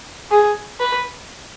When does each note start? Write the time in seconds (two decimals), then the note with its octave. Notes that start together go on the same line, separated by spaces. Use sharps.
0.31 G#4
0.80 B4